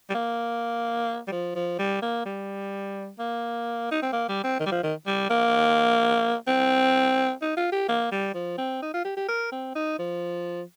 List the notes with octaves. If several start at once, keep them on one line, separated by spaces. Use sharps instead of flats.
G3
A#3
G3
F3
F3
G3
A#3
G3
A#3
D#4
C4
A#3
G3
C4
D#3
G3
F3
D#3
G3
A#3
C4
D#4
F4
G4
A#3
G3
F3
C4
D#4
F4
G4
G4
A#4
C4
D#4
F3